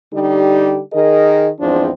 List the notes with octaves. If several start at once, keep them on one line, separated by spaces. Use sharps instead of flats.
D3 G3 D#4 G4
D#3 G#4 A#4 D#5
E2 G#2 F3 C4 D4